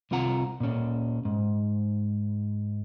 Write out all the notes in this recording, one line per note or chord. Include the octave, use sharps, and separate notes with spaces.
C2 C4 F4 F#5 A#5
A#2 C#4
G#2